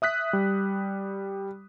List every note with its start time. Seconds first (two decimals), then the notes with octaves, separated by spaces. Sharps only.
0.02 E5 D#6 F#6 B6
0.33 G3